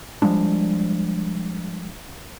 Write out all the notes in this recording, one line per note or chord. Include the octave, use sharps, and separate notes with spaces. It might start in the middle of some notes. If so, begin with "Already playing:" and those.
F3 G3 G#3 D4